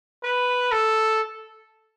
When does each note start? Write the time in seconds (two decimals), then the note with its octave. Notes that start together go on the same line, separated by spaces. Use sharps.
0.24 B4
0.72 A4